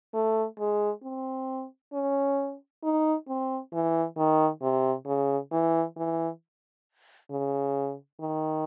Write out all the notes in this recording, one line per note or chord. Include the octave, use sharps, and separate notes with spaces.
A3
G#3
C4
C#4
D#4
C4
E3
D#3
C3
C#3
E3
E3
C#3
D#3